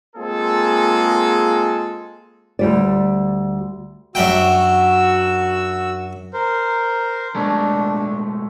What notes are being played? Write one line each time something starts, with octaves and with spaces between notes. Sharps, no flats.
G#3 A#3 C4 F4 G#4 A4
D2 G3 D5
F#2 D4 F#4 G5 E6
A#4 C5
B2 G#3 A3 D4